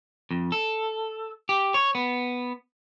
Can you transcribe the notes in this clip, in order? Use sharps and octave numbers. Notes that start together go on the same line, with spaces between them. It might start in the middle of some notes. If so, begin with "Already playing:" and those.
F2
A4
G4
C#5
B3